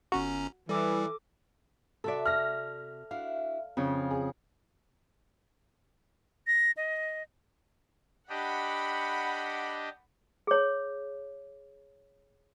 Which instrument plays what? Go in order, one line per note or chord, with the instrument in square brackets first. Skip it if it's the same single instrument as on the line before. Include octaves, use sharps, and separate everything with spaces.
[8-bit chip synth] G1 C#4 A#5 [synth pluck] F#4
[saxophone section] E3 [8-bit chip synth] G3 [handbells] A4 D6
[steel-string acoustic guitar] C3 F#4 E5 [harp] A4 D5
[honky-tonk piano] F6 A#6
[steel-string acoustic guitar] D4 E4 F#4 [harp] F5
[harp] F2 C#3 C#4 [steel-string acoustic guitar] F4
[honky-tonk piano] G#4
[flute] A#6
D#5
[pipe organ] D4 G4 D#5 [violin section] F#5 B5
[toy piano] G#4 C#5